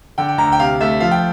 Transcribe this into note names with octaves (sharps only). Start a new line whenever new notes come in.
D3 G5
G5
D2 A#5
G5
C3 F5
A3 E5
F3 F5
G5